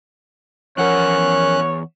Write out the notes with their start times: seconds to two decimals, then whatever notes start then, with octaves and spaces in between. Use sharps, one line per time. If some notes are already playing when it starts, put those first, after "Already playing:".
0.77 E2 E3 F3 C#4 A#4 C#5 F#5 F#6